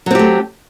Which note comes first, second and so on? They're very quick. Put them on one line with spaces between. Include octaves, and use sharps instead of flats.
F#3 C4 G4 A3